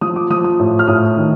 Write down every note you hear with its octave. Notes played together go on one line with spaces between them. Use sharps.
F3 D#6
D6
F3 D#6
D#6
A2
F6
A2 D#6
D#3